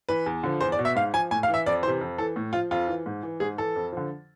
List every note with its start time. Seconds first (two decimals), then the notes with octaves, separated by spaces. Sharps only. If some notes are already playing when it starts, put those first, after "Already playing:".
0.09 E3 B4
0.26 E2
0.43 D3 F3
0.61 E2 C5
0.72 D5
0.79 B2
0.85 E5
0.96 G#2 F5
1.13 F3 G#5
1.31 A2 G#5
1.43 F5
1.48 E3
1.54 E5
1.66 F2 D5
1.83 E3 C5
1.88 C3
2.01 F2
2.18 E3 A4
2.36 A2
2.53 F3 F4
2.71 F2 F4
2.88 E3
3.06 G#2
3.23 E3
3.40 G#2 G#4
3.58 E3 A4
3.76 F2
3.92 D3 F3